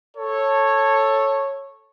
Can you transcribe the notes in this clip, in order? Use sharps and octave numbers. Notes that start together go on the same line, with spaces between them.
A4 C#5